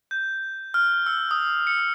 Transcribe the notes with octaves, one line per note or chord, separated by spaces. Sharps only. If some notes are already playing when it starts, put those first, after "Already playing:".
G6
F6
E6
D#6
C#7